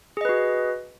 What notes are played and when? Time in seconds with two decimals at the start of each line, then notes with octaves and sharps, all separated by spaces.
0.17 G#4
0.21 D#5
0.25 B4
0.29 F#4